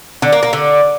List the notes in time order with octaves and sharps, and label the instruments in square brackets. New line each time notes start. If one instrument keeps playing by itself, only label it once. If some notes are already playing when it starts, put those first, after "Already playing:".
[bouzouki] D3
A#3
A#3
D3